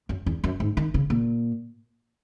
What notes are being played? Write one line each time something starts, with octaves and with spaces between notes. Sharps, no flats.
F#2
E2
F#2
G#2
D#3
C#3
A#2